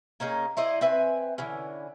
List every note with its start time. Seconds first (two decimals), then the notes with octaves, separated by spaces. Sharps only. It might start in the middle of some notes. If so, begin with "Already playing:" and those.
0.20 A#3 C#4 D#4 G#4
0.57 E4 C5 D5 D#5
0.81 C4 B4 E5 G#5
1.38 D3 E3 C#4